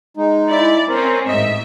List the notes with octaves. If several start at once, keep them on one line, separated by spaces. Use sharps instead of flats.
G#3 D#4
E4 D5
C4 C#4 A#4 C5
A1 G#2 D#5 E5